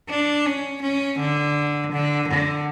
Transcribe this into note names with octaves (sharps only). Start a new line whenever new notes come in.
D4
C#4
C#4
D3
D3
D3